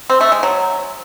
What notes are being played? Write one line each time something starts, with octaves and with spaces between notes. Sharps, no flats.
C4
A3
G#3
F#3